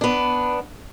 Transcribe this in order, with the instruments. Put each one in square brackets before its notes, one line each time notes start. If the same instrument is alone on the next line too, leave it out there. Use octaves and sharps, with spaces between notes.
[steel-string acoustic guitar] B3 D4